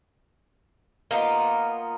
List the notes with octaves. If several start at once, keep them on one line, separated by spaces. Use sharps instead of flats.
A#3 B3 D#4 F4